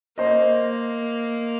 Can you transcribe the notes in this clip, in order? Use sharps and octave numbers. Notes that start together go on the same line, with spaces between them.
A#3 C5 D#5